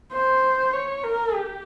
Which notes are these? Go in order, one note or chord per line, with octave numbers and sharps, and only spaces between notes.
C5
C#5
A#4
G4